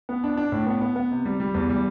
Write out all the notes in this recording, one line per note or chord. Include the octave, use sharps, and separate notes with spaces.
B3
D4
D4
A2
B3
B3
B3
C3
G3
G3
E2
G3